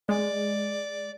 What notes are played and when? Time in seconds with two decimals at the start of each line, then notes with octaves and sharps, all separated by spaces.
0.09 G#3 D5